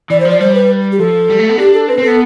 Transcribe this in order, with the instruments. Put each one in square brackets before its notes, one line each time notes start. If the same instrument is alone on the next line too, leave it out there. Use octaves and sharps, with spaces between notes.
[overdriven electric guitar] E3 [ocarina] D5
[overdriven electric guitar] F3 [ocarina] C5
[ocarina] D5
[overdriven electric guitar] G3 [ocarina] C5
[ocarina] B4
G4
[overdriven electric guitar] F3 [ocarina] A4
[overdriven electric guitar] G3
A3
B3
[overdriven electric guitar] D4 [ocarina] G4
[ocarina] A4
[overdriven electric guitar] C4 [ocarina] B4
[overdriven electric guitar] C4
[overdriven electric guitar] B3 [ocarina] A4